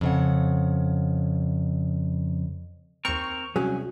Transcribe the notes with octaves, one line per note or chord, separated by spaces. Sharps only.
F2 C#3 F#5
D#2 C4 A#4 C#6
C2 F#3 C#4 F#4 G#4